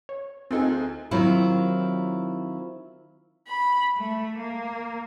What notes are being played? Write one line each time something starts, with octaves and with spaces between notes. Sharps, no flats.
C#5
D2 C4 D#4 F4 G#4 A4
D#3 F#3 C4 E4 F4
B5
A3
A#3